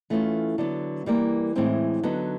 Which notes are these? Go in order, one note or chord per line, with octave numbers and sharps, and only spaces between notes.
E3 A3 C#4 F4
D3 F#3 B3
E3 G3 A#3
A2 E3 G#3 C4
D3 F#3 B3 D#4